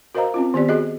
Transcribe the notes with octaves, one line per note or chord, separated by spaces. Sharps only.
F#4 A#4 C5 D#5 F5 A#5
C4 C#4 F4
D#3 B3 G4 D5
F#4 G#4 D#5